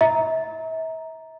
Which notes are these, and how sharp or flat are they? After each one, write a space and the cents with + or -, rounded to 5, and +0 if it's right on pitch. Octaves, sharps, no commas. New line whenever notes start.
E5 -40 A#5 +0